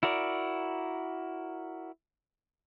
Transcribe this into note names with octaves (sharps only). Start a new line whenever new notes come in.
E4 F#4 A#4 D5